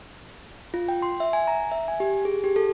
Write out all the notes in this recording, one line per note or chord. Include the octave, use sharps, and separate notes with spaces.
F4
G5
C6
E5
G#5
A#5
E5
G#5
G4
G#4
G4
A4